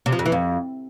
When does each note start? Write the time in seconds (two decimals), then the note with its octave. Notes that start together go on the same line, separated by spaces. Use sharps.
0.06 C3
0.12 F3
0.19 F2
0.26 E3
0.32 F2